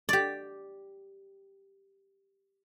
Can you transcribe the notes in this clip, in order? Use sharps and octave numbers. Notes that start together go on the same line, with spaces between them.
G4 D5